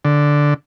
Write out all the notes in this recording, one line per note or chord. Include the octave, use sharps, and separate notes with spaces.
D3